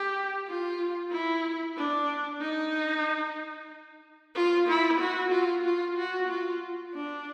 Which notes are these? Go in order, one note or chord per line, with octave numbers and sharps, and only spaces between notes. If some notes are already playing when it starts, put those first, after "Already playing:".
Already playing: G4
F4
E4
D4
D#4
F4
E4
F#4
F4
F4
F#4
F4
D4